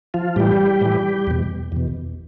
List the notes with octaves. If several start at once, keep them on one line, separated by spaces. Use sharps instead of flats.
F3 F4
A2 E3 G3 G4
A2 E3
E2 B2
E2 B2